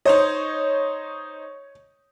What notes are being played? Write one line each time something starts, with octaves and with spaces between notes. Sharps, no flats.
D#4 C5 C#5 D#5